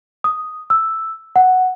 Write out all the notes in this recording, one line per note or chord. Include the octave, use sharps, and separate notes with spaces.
D#6
E6
F#5